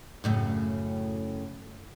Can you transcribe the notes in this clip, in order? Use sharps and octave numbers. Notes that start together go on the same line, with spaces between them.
F#2 A2 C#3